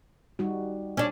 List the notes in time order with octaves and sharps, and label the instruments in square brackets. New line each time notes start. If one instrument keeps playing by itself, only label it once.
[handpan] G3 D#4 F#4
[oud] C#4 D4